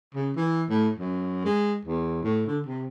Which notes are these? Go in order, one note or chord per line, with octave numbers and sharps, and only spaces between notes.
C#3
E3
A2
F#2
G#3
E2
A2
D3
C3